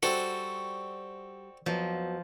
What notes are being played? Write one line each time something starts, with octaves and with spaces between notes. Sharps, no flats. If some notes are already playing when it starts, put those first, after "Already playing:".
G3 C4 F#4 A4
F2 F3 F#3 B3